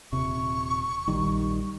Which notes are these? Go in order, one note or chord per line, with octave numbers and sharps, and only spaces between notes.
D#1 C3 C#6
A#1 D#3 G3